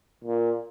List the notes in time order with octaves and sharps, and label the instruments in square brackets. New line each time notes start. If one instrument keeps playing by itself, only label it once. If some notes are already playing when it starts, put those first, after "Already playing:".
[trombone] A#2